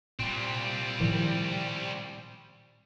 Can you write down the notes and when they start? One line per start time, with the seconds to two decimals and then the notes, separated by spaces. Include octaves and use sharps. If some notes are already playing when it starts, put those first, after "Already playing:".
0.20 A#2 G3 C4
1.00 A2 D#3 F3